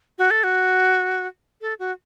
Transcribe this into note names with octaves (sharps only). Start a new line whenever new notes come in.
F#4
A4
F#4
A4
F#4